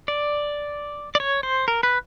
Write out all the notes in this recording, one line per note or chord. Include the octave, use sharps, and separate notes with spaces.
D5
D5
C#5
C5
A#4
B4